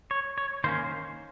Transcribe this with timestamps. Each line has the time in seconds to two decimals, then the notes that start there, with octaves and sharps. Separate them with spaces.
0.11 C#5
0.38 C#5
0.64 D#3 A#3 C#4 C5
0.84 C5